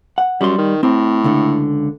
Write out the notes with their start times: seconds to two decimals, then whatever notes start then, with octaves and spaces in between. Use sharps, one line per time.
0.18 F#5
0.41 F#2 G3 C6
0.58 D#3
0.83 A2 C4
1.24 C#2 D3